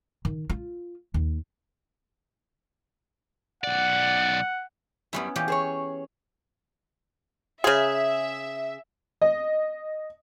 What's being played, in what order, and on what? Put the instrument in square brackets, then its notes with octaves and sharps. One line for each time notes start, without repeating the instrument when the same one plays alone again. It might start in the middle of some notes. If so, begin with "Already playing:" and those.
[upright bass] D#3
F4
D#2
[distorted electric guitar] B1 D5 [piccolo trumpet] F#5
[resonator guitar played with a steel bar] F#2 G3 [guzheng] B3 C#4 E4
[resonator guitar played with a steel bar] A#2 [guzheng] E3 C#4 G4
[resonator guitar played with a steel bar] G#4 C5 C#5
[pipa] C#3 G#4 [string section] E5
[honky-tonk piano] D#5